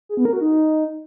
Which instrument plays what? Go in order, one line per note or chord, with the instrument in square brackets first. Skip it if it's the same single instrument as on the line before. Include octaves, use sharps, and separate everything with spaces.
[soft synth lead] G#4
B3
A#4
F#4
D#4